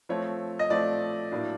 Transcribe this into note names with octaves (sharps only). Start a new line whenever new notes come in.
F3 A3 C4 C#5
D#5
F3 A3 C4 D5
A2 F#3 A#3 D4